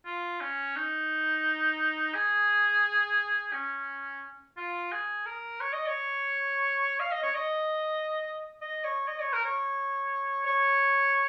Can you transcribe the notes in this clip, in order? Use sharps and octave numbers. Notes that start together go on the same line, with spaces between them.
F4
C#4
D#4
G#4
C#4
F4
G#4
A#4
C#5
D#5
C#5
F5
D#5
C#5
D#5
D#5
C#5
D#5
C#5
A#4
C#5
C#5